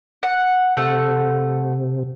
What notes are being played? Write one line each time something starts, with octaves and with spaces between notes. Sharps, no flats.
F#5
C3 A3 F#5